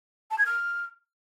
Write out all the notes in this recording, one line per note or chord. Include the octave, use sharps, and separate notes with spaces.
A5
G#6
F6